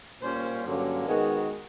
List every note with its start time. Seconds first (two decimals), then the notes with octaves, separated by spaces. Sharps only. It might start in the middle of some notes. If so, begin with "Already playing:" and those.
0.22 A#2 G3 A#3 C#4 C5
0.65 G2 D3 F#3 A#3 C#4
1.07 D#3 G#3 B3 D#4 F#4 A#4